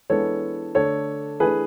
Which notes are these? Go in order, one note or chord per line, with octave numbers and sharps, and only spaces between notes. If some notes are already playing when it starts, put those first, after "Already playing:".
E3 G#3 B3 D4 A4 C#5
D3 A3 D4 A4 C#5
E3 A3 D4 G#4 B4